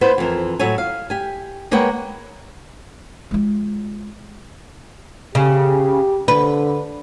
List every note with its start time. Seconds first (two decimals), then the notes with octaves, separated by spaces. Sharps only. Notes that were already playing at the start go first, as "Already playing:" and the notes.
0.01 B3 E4 B4 C5
0.18 F2 E3 A#4
0.59 A2 F#3 A3 C#5 G#5
0.78 F5
1.10 G4 G#5
1.71 G#3 A#3 B4 C#5 F#5 G5
3.31 G#3 F4
5.35 C#3 G4
6.28 D3 B4